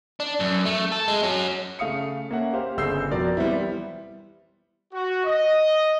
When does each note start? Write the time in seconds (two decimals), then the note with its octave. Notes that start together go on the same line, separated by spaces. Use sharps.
0.20 D4
0.40 F#2
0.65 A3
0.92 A4
1.08 G#3
1.23 F#3 C#4
1.79 C#3 A3 F5 D#6 C#7
2.31 A#3 C#4 E5 F#5
2.53 G4 C5 F5
2.77 G1 C#3 G#4 E6 G6 C7
3.11 F2 B2 A#4 D5
3.37 E3 G3 B3 C4 E4
4.93 F#4
5.25 D#5